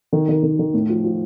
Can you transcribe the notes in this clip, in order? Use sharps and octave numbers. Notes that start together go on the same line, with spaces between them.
D#3
D#3
D#3
D#3
A2
F3
F3